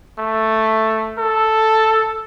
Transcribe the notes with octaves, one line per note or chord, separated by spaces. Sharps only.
A3
A4